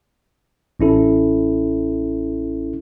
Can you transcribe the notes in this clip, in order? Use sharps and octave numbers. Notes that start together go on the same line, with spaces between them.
A1 C#4 E4 A4